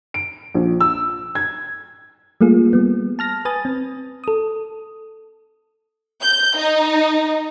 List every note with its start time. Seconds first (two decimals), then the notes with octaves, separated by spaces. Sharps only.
0.14 D7
0.55 A#1
0.81 E6
1.35 G#6
2.41 G3 A3 A#3 F4 G#4
2.73 G3 B3
3.19 A5 F6 A#6
3.45 B4 G#5 D#6 A6
3.65 C4
4.24 A4 D#6
6.22 G6
6.58 D#4